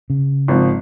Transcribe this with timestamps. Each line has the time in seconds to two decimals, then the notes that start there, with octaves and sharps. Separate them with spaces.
0.10 C#3
0.48 G#1 F3